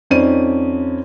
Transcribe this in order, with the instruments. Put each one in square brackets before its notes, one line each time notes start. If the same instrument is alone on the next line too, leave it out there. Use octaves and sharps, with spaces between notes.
[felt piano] F2 C#4 D#4 C5 D5 D#7